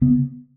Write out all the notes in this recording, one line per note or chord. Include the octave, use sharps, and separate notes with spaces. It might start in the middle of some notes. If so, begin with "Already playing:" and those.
C#3 B3